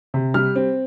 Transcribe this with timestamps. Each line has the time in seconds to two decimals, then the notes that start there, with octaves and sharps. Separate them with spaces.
0.14 C3
0.34 G3 F6
0.56 C4